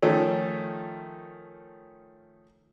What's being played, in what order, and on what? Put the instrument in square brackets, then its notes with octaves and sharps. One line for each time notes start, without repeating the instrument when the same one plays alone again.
[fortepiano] D#3 F3 A3 C#4